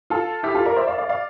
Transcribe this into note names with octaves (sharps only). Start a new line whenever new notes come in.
F4 A4
E4 G4
F4 A4
A#4 D5
C5 E5
D5 F5
D5 F5
D5 F5